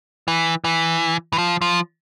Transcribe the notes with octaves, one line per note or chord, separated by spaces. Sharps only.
E3
E3
E3
F3
F3